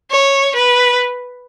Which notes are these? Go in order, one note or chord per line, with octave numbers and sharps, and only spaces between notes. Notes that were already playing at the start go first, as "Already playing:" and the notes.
C#5
B4